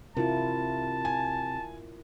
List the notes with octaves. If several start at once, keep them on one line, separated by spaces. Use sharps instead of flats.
C3 E4 F4 A#4 A5
G#5